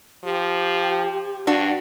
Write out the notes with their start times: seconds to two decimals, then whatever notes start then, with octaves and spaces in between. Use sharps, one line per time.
0.24 F3 G4
1.47 G2 D4 F#4